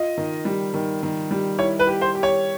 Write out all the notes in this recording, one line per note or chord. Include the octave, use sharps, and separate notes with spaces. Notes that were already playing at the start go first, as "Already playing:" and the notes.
Already playing: F4 D#5
D#3
G3
D#3
D#3
G3
E4 C#5
B4
G4
C5
G4
C#5